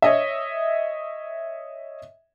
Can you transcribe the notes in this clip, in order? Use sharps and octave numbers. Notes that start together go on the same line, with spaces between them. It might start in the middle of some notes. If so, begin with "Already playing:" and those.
C#5 D#5 E5